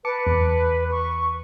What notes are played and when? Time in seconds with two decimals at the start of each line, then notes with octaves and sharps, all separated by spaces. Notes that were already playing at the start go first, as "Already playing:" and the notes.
0.05 B4 A5 D6 C#7
0.27 E2
0.91 C#6